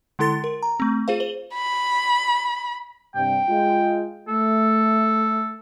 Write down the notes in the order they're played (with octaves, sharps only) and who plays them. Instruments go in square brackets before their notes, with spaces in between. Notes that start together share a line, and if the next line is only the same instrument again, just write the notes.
[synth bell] D3 G#3 E4 A4 C6 A6
A#4
A#5
A3 C4
F4 G#4 C5 F5
C5 F#7 G7
[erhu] B5
[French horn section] G2 C3 [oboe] G5
[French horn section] G#3 F4
[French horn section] A3 [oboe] A4